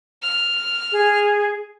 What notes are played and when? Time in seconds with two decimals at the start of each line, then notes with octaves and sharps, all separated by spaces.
0.22 F6
0.92 G#4